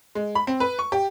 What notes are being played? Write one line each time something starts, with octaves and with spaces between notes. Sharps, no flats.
G#3
B5
C4
B4
C#6
G4